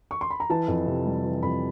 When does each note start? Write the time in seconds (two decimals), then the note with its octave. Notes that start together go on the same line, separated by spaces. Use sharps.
0.11 C#6
0.21 C6
0.30 B5
0.40 A#5
0.50 E3 A5
0.68 F2
0.87 C3
1.05 G3
1.25 E3
1.43 F2 B5